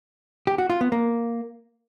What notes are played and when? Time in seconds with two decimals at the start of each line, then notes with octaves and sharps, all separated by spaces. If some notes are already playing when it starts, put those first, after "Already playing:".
0.47 G4
0.58 F#4
0.70 F4
0.81 B3
0.92 A#3